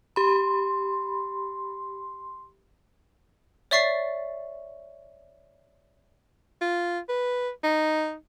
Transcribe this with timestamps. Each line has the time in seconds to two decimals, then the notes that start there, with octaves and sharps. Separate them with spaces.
0.16 G4 B5 C6
3.71 C#5 D5 E5 C#6 A6 C7
6.61 F4
7.08 B4
7.63 D#4